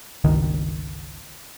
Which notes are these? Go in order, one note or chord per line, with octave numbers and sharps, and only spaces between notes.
G1 C#2 D#3